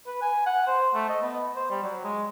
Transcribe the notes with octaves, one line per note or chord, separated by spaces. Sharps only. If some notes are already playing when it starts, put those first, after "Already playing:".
B4
G#5
F#5
C5
A3
D#5
B3
C5
G3
F#3
G#3